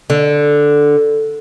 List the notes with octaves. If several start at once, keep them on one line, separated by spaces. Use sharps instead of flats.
D3